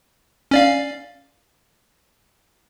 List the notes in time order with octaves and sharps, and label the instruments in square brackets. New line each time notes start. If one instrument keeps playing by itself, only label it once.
[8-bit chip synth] C#4 D5 F5